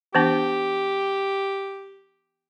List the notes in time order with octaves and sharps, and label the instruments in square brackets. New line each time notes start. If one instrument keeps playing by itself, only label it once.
[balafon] E3 B3 D4 [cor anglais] G4